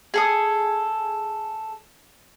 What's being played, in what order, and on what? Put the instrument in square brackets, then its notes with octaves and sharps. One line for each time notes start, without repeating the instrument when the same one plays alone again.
[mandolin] G#4 A4 D#6